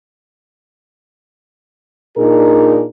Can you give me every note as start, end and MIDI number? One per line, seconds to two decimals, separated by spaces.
2.17 2.85 46
2.17 2.85 62
2.17 2.85 63
2.17 2.85 68
2.17 2.85 70